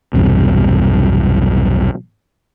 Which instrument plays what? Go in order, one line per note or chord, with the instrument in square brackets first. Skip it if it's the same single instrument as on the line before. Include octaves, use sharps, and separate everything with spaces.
[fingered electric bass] B1 E2 G2 C3